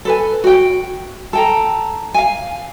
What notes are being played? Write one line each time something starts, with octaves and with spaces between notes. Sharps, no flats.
A4 B4 G#5
F#4 G5
A4 G5 A#5
F5 G#5